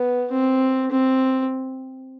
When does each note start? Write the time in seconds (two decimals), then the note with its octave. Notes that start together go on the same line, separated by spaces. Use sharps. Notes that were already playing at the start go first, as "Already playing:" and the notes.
Already playing: B3
0.32 C4
0.91 C4